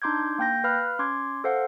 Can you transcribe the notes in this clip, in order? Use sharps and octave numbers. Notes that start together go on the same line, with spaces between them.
D4 D#4 C6 D6 G6 G#6
A#3 G5 G6 A#6
B4 F5 B5 F6 F#6
C#4 C6 D6 G#6
A4 C5 F5 F#5